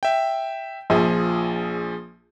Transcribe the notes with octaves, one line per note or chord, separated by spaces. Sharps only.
E5 G5
A#1 F3 G#4